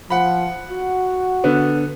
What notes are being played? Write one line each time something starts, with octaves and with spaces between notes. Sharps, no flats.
F3 F#5 B5
F#4
D3 B3